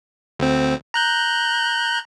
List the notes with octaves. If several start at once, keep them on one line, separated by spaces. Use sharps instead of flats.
D2 C4
A#5 F#6 G6